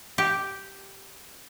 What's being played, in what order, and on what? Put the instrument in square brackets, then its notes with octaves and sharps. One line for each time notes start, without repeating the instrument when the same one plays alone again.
[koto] G4